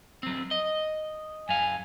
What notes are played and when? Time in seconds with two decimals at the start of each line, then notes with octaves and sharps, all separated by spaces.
0.23 F#3 C4
0.51 D#5
1.49 F#2 F5 G#5